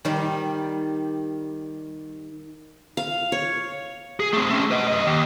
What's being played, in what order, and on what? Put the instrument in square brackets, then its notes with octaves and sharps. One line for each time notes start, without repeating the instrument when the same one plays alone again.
[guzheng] D#3 G3
[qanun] F5
C#5
[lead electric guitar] G#4
A3 C4
A3 C#4
B4 D#5
F#2 D#5
D#2